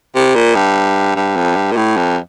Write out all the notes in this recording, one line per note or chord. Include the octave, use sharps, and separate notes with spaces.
C3
A#2
G2
G2
F2
G2
A#2
A2
F2